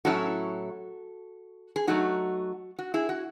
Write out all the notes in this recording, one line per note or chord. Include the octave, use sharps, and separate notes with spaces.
A2 F#3 C#4 E4 F#4 A4
G#4
F#3 A3 D#4 F#4
F#4
E4 G#4
F#4